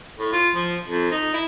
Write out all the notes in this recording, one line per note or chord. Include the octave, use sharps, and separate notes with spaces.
A2
F4
F3
F2
D#4
E4